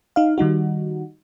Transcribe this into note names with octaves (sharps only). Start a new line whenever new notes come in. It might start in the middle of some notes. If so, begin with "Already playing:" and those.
D#4 F5
D#3 G3 D#4 F#4